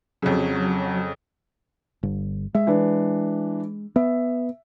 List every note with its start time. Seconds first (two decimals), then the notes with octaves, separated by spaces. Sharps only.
0.22 F2 C#3 F#3
2.03 G1
2.55 G#3 E5
2.67 E3 D4
3.96 B3 E5